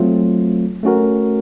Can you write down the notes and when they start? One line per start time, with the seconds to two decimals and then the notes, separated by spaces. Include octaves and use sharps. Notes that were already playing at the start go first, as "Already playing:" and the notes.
Already playing: F#3 A3 C4 F4
0.83 A3 C#4 F#4 A#4